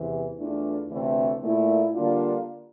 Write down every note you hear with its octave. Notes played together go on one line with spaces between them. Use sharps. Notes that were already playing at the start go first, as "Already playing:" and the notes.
Already playing: E2 C3 E3
E2 E3 A3 D4 F4
D2 C3 E3 A3 C4
A#2 A3 E4
D3 G3 A#3 D4 F4